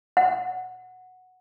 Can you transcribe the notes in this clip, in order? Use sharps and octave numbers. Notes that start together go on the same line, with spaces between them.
F#5